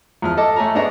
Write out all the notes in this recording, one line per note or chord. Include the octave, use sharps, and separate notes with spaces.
E2 F3 F6
A4 D#5 A5 D6
A3 C#5 G#5 A#5
G#2 B3 D4 C#5 D#5 A#5